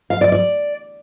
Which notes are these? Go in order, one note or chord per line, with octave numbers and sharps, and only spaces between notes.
F5
D5
D5